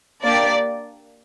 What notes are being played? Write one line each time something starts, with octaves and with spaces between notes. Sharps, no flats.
A#3 D4 G4 D5